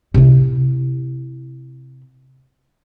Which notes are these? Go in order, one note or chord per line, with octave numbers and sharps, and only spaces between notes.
C3 E4